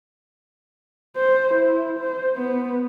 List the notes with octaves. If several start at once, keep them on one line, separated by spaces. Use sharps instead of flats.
C5
E4
C5
B3